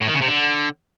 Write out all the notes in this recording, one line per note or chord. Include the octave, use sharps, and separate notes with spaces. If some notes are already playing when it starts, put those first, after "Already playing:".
A2
D#3
C#3
C3
D3